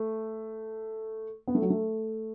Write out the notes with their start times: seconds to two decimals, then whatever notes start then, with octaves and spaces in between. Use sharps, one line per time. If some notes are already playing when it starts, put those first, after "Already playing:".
Already playing: A3
1.47 B3
1.55 A3
1.62 F#3
1.70 A3